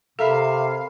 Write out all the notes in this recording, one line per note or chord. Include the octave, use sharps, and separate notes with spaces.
C3 A4 A#4 E5 F5 B5